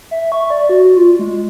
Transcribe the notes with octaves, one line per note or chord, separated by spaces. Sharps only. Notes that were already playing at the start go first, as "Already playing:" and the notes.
E5
C#6
D5
F#4
F4
G#3